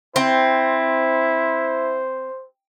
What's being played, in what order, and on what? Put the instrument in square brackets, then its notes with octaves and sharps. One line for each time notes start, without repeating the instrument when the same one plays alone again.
[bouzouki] C4 [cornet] E4 [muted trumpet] C5